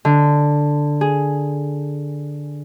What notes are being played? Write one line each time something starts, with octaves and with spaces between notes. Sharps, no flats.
D3
G#4